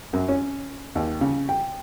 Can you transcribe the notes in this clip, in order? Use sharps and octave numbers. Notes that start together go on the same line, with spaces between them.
F#2
C#4
D#2
C#3
G5